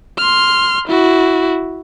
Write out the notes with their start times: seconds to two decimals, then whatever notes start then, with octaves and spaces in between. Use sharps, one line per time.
0.18 C6 F6
0.88 E4 F#4